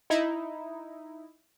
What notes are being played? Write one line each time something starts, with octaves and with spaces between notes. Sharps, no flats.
D#4 E4